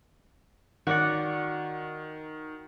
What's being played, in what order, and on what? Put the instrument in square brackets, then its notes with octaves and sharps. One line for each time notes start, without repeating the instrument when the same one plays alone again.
[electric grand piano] D#3 [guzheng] F#4 D5 F#5